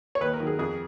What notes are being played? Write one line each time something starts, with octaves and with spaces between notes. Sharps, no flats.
C#5
D#2 B4
A#4
D#3 F#3
G#4
F2 G#4